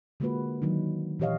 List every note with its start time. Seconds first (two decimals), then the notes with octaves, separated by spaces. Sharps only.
0.20 D3 G#3 A#3 F4 F#4 B4
0.62 D#3 F#3 D4 D#4
1.19 A#2 E3 G4 C#5 D#5 F5